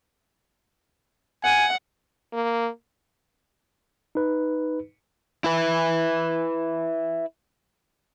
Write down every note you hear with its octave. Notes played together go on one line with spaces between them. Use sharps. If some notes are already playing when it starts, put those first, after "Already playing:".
F#5 G#5
A#3
D#4 B4
E4 B4